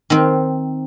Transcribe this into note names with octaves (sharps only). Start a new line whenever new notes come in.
D#3 C4